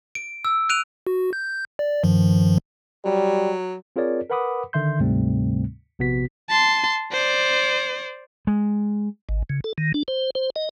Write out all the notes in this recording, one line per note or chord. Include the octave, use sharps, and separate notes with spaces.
D7
E6
F#6 D7 D#7 F7
F#4
G6
D5
G2 D#3 F3
F#3 G3
C4 F4 G#4 A#4 C#5 D5
A#4 B4 F#5 B5 D6 D#6
D3 D#3 E5 C6 G6
D2 G#2 C3 G3 A3 C4
A#1 C3 B3 F#4 B6
A5 C6
C5 D5
G#3
G#1
C#3
A4
D#3
D4
C5
C5
D#5